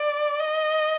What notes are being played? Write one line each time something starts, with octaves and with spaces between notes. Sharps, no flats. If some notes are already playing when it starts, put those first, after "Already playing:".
Already playing: D5
D#5